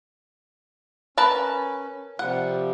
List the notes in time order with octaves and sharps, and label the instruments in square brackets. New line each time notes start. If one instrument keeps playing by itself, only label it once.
[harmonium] C#4 [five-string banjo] A#4 B4 A5
[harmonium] C3 F3 G3 [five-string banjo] F#5